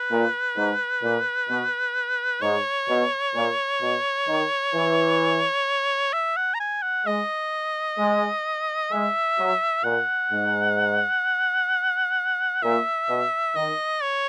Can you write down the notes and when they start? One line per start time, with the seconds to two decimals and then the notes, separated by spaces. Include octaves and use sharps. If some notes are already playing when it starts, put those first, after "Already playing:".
Already playing: B4
0.10 A#2
0.57 G#2
1.03 A#2
1.49 B2
2.42 G#2 C#5
2.89 B2
3.35 A#2
3.81 B2
4.28 D#3
4.74 E3
6.13 E5
6.36 F#5
6.54 A#5
6.60 G#5
6.82 F#5
7.06 G#3 D#5
7.99 G#3
8.92 G#3 E5
9.38 F#3
9.84 A#2 F#5
10.31 G#2
12.62 A#2 E5
13.09 B2
13.55 D#3 D#5
14.02 C#5